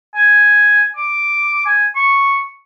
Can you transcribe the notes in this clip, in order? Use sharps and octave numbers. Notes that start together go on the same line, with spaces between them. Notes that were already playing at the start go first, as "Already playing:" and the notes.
G#5
D6
G#5
C#6